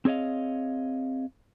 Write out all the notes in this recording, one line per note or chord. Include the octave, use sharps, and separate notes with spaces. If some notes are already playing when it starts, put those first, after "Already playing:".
C4 G#4 C#5 D#5 F5